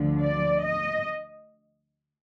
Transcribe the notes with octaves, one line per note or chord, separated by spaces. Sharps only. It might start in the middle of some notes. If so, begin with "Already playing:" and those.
Already playing: D2 D3 F3
D5
D#5